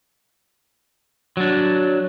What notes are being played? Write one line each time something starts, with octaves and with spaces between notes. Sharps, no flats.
F#3 D4